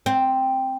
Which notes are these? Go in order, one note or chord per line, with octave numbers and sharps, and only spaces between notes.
C4